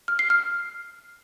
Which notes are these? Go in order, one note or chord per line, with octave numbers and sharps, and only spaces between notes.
F6
C7
F6